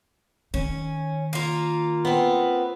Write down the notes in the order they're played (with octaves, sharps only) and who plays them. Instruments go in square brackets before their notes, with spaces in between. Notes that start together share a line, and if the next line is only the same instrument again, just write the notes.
[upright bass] D#3 [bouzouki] C#4
[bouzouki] A#3 F4
[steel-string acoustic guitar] B3 C4